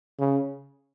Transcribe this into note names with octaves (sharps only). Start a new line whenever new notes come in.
C#3